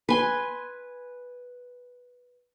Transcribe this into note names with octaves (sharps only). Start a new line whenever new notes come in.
B4 G#5 C6